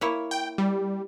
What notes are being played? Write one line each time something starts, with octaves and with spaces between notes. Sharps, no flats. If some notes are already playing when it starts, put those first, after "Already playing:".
A#3 E4 C#5
G5
G3